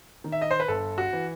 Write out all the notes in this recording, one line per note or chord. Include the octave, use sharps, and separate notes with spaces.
D#3
E5
D#5
C5
B4
G1 A4
F#4
E3